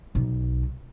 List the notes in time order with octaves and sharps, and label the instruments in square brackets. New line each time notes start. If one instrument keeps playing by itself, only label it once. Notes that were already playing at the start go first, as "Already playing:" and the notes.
[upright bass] B1